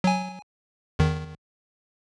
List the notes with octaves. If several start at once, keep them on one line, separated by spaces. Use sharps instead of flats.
F#3 G#5
E2 D#3